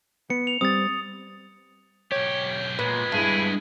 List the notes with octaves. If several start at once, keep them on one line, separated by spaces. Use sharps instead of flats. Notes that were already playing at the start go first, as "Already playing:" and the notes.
B3 C#7
F7
G3 C4 D#6 A6
B1 G4 C#5
A#2 G#3 B3 B4
G2 E4 G#4